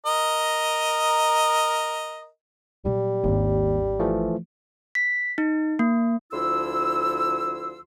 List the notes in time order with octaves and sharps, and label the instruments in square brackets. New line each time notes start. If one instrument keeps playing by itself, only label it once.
[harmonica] A#4 D#5
[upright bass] A#2 F#3 [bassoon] G3
[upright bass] G#1 D4 [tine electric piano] D#2
[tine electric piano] E3 F3 A3
[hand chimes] B6
D#4
A#3
[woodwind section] D2 F3 E4 C6 E6